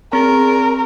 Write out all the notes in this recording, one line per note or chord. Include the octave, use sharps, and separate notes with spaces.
C4 G#4 A#4